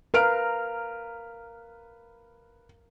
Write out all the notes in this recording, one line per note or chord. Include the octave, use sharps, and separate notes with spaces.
A#4 B4 F5 F6 D7